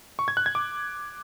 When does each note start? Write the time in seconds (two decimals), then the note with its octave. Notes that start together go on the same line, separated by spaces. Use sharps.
0.19 C#6
0.28 G#6
0.37 F#6
0.46 G#6
0.55 D6